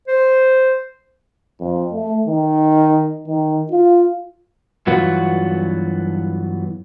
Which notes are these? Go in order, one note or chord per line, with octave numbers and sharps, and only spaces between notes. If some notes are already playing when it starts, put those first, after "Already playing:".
C5
F2
A3
D#3
D#3
F4
G2 E3 F#3 B3 F4 F#4